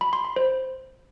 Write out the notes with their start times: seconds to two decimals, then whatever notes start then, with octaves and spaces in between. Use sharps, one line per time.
0.01 B5
0.13 C6
0.25 B5
0.36 C5